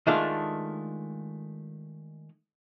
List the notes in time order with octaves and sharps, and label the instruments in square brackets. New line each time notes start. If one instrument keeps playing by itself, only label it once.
[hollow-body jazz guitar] D#3 G#3 A3 D4 F4 A4